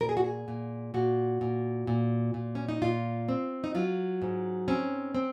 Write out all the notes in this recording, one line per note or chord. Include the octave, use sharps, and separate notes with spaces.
A#2 A#4
G#4
F#4
G#4
A#2
A#2 F#4
A#2
A#2
A#2
C#4
D#4
A#2 F4
C4
D#4
F#3 F4
G#2
C4 C#4
C4